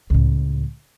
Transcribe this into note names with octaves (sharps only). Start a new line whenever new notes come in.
C#2 A2